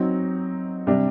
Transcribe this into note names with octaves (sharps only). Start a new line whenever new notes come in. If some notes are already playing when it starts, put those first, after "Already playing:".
Already playing: F#3 C4 D#4 F#4
C3 G3 D4